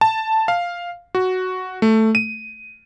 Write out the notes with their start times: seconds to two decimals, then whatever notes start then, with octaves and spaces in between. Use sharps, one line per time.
0.01 A5
0.48 F5
1.15 F#4
1.82 A3
2.15 D#7